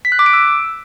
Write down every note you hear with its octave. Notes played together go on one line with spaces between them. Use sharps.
B6
F#6
D6
D7
E6